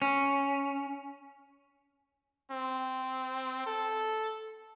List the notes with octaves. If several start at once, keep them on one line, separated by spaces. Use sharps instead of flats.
C#4
C4
A4